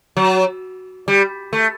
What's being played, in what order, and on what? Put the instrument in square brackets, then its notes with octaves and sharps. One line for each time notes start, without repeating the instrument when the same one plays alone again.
[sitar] F#3
G3
A3